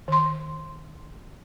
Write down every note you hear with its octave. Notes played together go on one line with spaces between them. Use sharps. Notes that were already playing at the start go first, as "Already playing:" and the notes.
D#3 C6